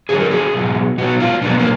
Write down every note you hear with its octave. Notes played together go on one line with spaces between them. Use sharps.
D3 F#3 G#4
A#4
G#4
B2 F#3
B2 F#3 F#4
F4
B2 F#3 D4
B3
A#3